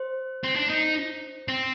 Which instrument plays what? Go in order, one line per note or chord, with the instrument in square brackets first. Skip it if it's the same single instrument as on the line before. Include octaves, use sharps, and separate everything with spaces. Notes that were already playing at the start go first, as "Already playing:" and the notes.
Already playing: [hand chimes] C5
[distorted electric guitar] C4
D4
D#4
C4